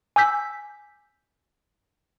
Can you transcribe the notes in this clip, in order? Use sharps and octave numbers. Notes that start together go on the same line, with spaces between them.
G#5 D6 E6 G6 B6